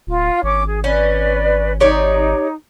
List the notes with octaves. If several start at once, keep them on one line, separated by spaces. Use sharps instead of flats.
D1 F4
G#1 C#4 D6
G#4
C#4 B4 D5
D#4 G4 C#5 D5